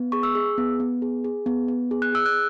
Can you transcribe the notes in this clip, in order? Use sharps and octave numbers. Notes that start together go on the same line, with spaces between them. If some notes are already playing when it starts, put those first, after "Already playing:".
Already playing: B3
G#4 C#6
E6
G#4
B3
B3
G#4
G#4
B3
B3
G#4
F#6
G#4 E6
F#6